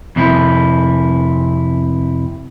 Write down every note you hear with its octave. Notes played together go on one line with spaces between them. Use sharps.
F2 C3 E4